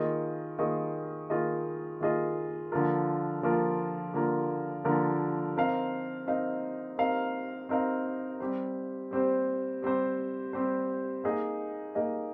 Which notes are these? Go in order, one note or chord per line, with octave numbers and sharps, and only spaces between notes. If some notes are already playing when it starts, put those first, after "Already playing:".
Already playing: D#3 A#3 F4 G#4 D#5
D#3 A#3 F4 G#4 D#5
D#3 A#3 F4 G#4 D#5
D#3 A#3 F4 G#4 D#5
D3 F3 A#3 F4 A#4
D3 F3 A#3 F4 A#4
D3 F3 A#3 F4 A#4
D3 F3 A#3 F4 A#4
C4 D#4 A#4 F5
C4 D#4 A#4 F5
C4 D#4 A#4 F5
C4 D#4 A#4 F5
G3 C4 G4 C5
G3 C4 G4 C5
G3 C4 G4 C5
G3 C4 G4 C5
A#3 D#4 G#4 D#5
A#3 D#4 G#4 D#5